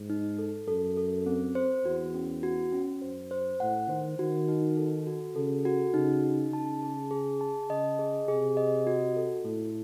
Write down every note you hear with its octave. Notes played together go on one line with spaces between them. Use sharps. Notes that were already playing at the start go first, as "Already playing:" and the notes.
Already playing: G#2
D#4
A4
F#2 A4
A4
C4
C5
E2 F#4
C#4
F#4
C#4
F#2 C5
C5
A2 F#5
D#3 C5
D#3 F#4
D#4
A4
F#4
C#3 A4
F#4
C#3 D#4
D#4
C#3 A5
G#4
G#4
A5
C#3 D#5
G#4
C3 G#4
D#5
F#4
A4
A2 A4